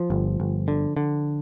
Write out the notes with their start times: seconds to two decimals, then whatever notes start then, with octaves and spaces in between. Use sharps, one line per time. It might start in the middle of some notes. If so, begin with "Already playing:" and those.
Already playing: F3
0.10 G1
0.40 G1
0.68 D3
0.97 D3